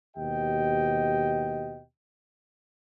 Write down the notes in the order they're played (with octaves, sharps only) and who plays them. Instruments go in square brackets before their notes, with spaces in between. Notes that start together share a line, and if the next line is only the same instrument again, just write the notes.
[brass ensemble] D#2 B2 G4 D#5 G5